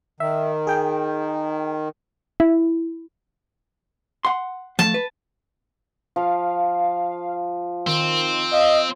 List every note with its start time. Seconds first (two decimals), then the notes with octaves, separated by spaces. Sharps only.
0.20 D#3 E5
0.67 G#4 G5
2.40 E4
4.25 F#5 C6
4.79 F3 A3 A5
4.94 B4
6.16 F3 F5
7.87 D#3 C4
8.52 D#5 F5